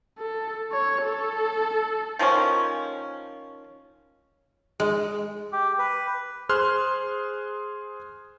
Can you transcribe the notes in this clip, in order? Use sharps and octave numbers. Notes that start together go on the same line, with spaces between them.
A4
C#5
A4
D#3 F3 A#3 C#4
G#3
G4
B4
G#4 C5 C6 F6 F#6